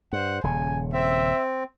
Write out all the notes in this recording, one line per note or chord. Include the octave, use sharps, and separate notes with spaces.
G2 C5 F#5
D#1 C#3 G#5
C4 E5